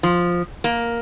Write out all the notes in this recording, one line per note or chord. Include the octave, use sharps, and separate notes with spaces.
F3
A#3